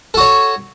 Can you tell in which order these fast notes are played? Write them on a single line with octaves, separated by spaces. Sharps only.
A4 F#4 C#5